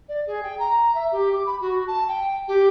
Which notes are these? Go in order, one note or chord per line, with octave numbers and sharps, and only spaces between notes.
D5
G#4
G5
A#5
E5
G4
D6
B5
F#4
A5
G5
G4